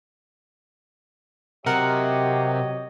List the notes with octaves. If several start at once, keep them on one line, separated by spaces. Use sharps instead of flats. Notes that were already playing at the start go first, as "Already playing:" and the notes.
C3 F#3 G4 A#4 C#5 D#5 F#5